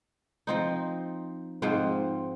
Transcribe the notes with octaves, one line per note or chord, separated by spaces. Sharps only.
F3 C4 D#4
G#2 F3 C4